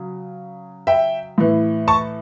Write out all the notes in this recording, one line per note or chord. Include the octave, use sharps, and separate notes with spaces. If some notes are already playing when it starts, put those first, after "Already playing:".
Already playing: C#3 F#3
E5 G5
A2 E3
A5 C#6